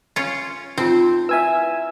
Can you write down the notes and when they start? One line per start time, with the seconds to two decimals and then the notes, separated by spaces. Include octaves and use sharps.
0.16 C#4 F4
0.78 C4 D#4 F4
1.29 E4 B4 E5 G#5 E6